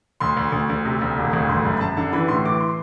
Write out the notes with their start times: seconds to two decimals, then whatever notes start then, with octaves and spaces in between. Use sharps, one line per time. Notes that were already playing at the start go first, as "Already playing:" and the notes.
0.20 D2 C6
0.37 D2
0.52 D2
0.70 D2
0.85 C3
1.02 D2
1.18 E1
1.33 D2
1.49 G1 C6
1.65 F#2 B5
1.77 B5
1.81 F#2 A5
1.97 D3 A5
2.13 E3 B5
2.28 A2 C6
2.45 E3 D6
2.61 C6